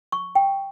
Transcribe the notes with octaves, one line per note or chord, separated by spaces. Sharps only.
C#6
G5